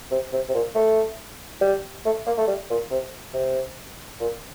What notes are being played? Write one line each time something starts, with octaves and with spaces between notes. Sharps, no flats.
C3
C3
C3
A#2
A3
G3
A3
A#3
A3
G3
A#2
C3
C3
A#2